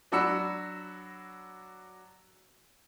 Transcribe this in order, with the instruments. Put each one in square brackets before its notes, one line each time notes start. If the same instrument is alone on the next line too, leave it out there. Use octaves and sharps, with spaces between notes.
[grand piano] F#3 D4 F#4 B5 E6 C#7